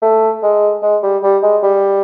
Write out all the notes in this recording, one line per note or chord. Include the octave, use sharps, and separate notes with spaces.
A3
G#3
G#3
G3
G3
G#3
G3